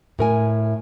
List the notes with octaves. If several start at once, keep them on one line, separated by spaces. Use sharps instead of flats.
A2 A#4 G#5